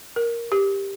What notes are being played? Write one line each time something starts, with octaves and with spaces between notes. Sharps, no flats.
A#4
G4